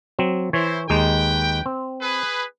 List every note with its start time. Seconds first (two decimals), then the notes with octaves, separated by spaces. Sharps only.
0.19 F#3 C4
0.53 E3 E4 C5 C#5
0.90 D#2 G#3 D#4 B4 G5
1.66 C4
2.01 G#4 B4